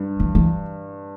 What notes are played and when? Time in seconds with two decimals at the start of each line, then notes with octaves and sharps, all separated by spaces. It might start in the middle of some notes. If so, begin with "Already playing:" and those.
Already playing: G2
0.20 E3
0.35 E3